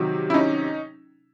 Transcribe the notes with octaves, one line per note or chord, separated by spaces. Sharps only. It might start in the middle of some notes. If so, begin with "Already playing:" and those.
Already playing: C3 D#3 F#3
E4
C#4 D#4